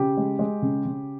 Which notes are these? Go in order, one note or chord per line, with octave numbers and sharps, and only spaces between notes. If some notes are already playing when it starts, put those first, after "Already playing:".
Already playing: C#3 G4
G#3
G#3
C#3
C#3